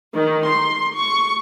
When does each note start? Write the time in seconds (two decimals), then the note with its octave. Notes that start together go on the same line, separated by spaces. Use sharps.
0.13 D#3
0.46 C6
0.95 C#6